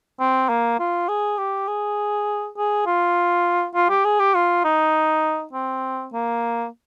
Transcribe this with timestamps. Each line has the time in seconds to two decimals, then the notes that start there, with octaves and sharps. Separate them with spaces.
0.20 C4
0.49 A#3
0.80 F4
1.09 G#4
1.38 G4
1.68 G#4
2.57 G#4
2.86 F4
3.75 F4
3.90 G4
4.05 G#4
4.20 G4
4.35 F4
4.64 D#4
5.53 C4
6.13 A#3